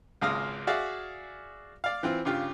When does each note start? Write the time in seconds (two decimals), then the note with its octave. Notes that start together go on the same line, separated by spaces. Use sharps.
0.21 G#1 C#2 G#3 F5 D#6 F6
0.67 F#4 G#4 D5 E5 F5
1.84 D5 F5
2.03 E3 C4 F4
2.25 G2 C#3 F4 G4